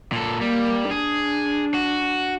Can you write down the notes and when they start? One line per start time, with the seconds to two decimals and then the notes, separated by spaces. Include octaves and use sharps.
0.12 A#2 A4
0.41 G3 A#3
0.91 D4 G#4
1.74 F#4